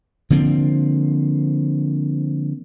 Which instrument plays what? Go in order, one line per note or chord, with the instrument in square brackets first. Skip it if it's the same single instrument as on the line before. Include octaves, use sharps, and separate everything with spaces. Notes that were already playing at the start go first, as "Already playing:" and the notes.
[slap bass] D3 F3 A#3 C4